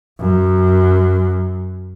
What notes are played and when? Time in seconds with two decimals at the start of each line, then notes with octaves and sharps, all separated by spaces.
0.20 F#2